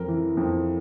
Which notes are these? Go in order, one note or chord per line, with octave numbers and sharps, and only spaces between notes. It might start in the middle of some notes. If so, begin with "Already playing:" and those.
Already playing: F2 A#4
E3
F2